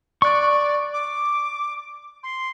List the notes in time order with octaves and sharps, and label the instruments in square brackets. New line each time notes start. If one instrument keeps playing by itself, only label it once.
[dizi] D5 [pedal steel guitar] C#6 F#6
[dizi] D6
C6